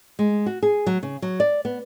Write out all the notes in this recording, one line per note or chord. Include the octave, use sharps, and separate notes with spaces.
G#3
F#4
G#4
F#3
C#3
F#3
D5
B3